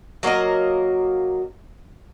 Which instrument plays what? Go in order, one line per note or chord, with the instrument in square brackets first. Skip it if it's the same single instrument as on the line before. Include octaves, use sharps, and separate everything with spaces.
[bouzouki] F#3 A#3 A#4 D#5